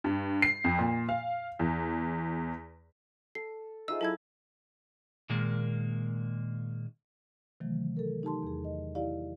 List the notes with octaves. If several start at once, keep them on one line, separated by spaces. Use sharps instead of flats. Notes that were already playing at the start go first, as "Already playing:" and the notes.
G2
C7
F2
A#2
F5
E2
A4 C7
D#4 F4 G#4 C5 D#5 E5 E6
F#3 E4 A4 A5 G#6
A#2 D#3 G#3 A#3
C3 D#3 E3 F#3 A3
A4 A#4
D#4 G4 A5 C6
E2 G#4
D#5
E4 G4 D5 F5